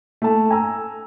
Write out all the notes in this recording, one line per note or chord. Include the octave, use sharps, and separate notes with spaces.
A3 A5
G#5 A#5 E6